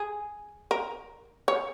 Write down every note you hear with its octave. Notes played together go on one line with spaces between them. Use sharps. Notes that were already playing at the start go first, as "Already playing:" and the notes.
Already playing: G#4
A#4
C#5